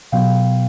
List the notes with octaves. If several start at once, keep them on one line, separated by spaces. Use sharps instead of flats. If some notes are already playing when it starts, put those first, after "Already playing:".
B2 F#3 B3 F5 G5